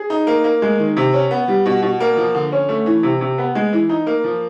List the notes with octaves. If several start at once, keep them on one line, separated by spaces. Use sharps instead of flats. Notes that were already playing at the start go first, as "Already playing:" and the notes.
Already playing: G#4
D#4
A#3
A#3
G#3
D#3
C3
C#4
B3
G3
B2
B2
A#3
F3
D3
C#4
A3
E3
C3
C3
B3
G#3
E3
D#4
A#3
F3